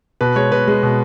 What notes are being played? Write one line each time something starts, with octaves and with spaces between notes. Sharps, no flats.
B2 B4
G#3 C#5
B2 B4
G#3
B2